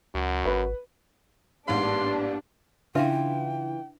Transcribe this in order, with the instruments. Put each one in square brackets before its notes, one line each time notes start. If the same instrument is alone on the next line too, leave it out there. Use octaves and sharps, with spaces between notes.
[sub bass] C#2 [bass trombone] F#2 [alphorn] F#4
[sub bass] G#1 [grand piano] B4
[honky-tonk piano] A1 G#2 F5 [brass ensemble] A#3 B3 G4 [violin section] D4 [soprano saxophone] C6
[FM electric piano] C#3 E4 [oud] E3 F4 [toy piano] D4 B4 E5 [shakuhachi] G5